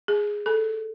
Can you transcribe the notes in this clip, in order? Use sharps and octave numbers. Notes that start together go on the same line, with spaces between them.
G#4
A4